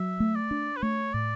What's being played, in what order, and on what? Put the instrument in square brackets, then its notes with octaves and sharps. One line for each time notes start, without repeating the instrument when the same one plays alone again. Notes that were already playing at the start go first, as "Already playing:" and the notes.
Already playing: [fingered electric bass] F#3 [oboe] E5
[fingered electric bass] A3
[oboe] D5
[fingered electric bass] D4
[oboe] B4
[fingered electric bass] A3 [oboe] C#5
[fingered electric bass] A2 [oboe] D5